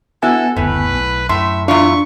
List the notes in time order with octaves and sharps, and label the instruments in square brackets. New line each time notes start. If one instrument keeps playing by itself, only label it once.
[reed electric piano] B3 G#5 [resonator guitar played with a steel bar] E4 F#4 [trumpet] A4
[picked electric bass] F#1 D2 [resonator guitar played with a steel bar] A2 [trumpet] B4
[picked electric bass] B1
[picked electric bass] F#2 [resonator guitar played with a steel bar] A2 [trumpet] E5 [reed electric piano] C6
[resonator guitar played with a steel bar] E2 E4 F4 [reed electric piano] D4 [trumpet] C#6